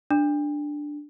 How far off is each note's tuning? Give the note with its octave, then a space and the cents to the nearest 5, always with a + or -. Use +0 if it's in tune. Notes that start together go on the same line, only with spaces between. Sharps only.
D4 +5